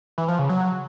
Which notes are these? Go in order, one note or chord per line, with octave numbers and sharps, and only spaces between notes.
E3
F3
C#3
F#3